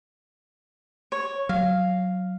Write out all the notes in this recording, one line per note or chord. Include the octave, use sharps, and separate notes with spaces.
C#5
F#3 F5